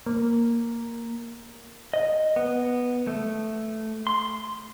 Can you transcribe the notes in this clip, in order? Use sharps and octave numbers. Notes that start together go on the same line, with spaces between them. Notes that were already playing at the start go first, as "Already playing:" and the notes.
A#3
D#5
B3
A3
C6